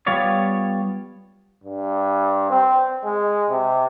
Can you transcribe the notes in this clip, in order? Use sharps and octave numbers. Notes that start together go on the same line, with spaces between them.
G3 B3 F4 C#5 D5
G2
C4
G#3
C3